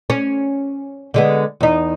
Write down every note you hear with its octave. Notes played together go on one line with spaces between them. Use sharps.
C#4
D3 G#3 B3
E2 D#4